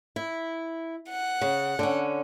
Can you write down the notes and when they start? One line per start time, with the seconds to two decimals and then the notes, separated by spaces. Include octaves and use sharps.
0.16 E4
1.10 F#5
1.42 C#3
1.79 D3 C#4